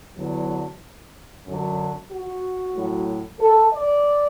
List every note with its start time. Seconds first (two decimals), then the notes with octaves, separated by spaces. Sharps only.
0.17 E2 D3 F#3
1.46 F#2 D3 F#3
2.10 F#4
2.75 A2 F#3
3.40 A4
3.73 D5